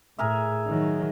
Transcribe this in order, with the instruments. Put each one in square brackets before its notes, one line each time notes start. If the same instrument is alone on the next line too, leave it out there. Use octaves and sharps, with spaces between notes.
[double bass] A2 [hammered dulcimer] G#4 A#4 E5
[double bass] D#3 F#3